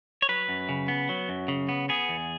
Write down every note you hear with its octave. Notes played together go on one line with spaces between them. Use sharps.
C#5
F#3 B4
F#2
C#3
B3
F#3
F#2
C#3
B3
B3 G#4
E2